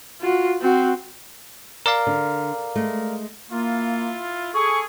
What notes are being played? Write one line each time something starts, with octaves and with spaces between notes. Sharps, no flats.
F4 F#4
C4 F#4
A#4 D5 F5
D3
G#3 A3
A#3 E4 F4
G#4 A4 C#6